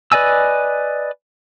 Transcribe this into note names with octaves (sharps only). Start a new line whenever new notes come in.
B4 D5 D#5 G#5 E6